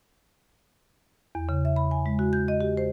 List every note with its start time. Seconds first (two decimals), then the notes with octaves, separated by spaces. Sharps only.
1.35 E2
1.49 C#3
1.65 E5
1.76 B5
1.91 G#5
2.06 G#3
2.19 F#4
2.33 G6
2.48 D#5
2.61 G4
2.77 C5